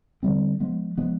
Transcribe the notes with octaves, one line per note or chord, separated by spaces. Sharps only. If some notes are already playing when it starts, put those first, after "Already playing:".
D3 G3 C4
F3 G#3 B3
F3 G#3 B3